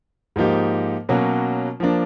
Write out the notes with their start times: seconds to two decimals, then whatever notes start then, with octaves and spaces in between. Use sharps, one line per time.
0.36 G#2 F3 A#3 D#4 G4
1.09 B2 F#3 A#3 C#4 F#4
1.80 F3 A#3 D4